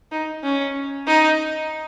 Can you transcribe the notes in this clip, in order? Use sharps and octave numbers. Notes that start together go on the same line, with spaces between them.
D#4
C#4
D#4